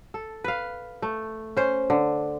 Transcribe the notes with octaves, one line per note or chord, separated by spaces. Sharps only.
A4
B4 F5
A3
C#4 C5
D3